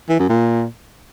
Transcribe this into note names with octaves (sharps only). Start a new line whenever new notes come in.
E3
F#2
A#2